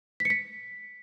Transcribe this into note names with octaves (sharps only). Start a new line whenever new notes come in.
B6
C#7
B6